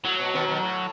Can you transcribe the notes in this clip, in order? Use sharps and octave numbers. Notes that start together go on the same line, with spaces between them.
A2 F#3
B2
B2 D#3
B2 D#3
A2